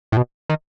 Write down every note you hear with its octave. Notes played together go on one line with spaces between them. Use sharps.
A2
B2
D#3